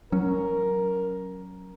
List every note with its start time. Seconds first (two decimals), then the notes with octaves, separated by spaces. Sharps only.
0.12 F#3 C#4 A#4